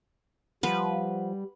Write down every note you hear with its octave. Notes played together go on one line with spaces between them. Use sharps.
F3 G3 B4 F#5